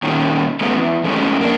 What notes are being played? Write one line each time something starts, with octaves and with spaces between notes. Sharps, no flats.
A#2 D#3 C#4
G#3 A3 B3 C#4
E2
E2 G#2 G#3 A3 C#4
A#3 D4